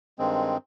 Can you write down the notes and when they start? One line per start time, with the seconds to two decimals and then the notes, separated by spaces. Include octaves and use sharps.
0.18 G2 D#3 G#3 C4